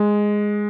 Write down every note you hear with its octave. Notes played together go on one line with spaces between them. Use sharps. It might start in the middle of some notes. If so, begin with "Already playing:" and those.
Already playing: G#3